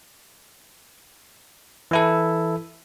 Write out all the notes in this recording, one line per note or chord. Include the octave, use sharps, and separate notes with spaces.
E3 E4 A4